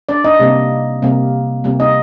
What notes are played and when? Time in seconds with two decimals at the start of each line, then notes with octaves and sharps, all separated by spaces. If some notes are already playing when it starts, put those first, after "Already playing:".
0.09 D4 D5
0.24 D#4 D#5
0.40 C3 G3 A#3
1.02 C3 G3 A#3
1.64 C3 G3 A#3
1.80 D#4 D#5